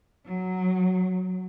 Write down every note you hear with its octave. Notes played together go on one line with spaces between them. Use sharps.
F#3